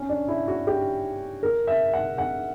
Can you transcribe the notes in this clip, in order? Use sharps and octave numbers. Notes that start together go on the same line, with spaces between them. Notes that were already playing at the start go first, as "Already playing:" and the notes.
Already playing: C#4
D4
E4
F#4
G4
A#4
E5
F#5
F#5